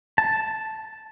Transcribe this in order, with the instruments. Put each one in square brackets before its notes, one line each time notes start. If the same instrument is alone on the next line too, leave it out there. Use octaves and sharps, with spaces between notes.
[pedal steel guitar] A5